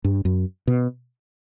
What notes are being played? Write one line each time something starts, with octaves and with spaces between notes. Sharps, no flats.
G2
F#2
B2